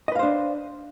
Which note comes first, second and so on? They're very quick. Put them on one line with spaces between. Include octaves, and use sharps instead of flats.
D#5 B4 F5 C5 D4